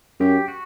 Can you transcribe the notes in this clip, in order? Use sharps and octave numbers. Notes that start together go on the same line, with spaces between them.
F#2 G4
F#4